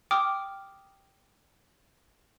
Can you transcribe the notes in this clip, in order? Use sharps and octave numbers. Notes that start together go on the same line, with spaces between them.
G5 D6 D#6 F6